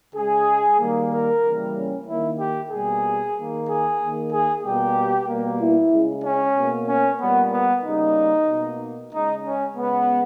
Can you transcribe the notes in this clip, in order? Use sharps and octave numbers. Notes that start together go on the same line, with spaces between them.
C#3 G#3 G#4
D#3 G3 A#3
A#4
C#3 E3 G3 A#3
C#4
D#3 A#3 E4
G4
B2 G3 A#3 G#4
D#3 A#3
G#4
D#3 A#3
G#4
B2 G3 A#3 G4
B2 G3 A#3
E4
C#3 G#3
C#4
B2 A#3
C#4
A#2 G3 A#3 B3
B3
C#3 G3 A#3 D#4
B2 A#3
C#3 G#3 D#4
C#4
C#3 G#3 B3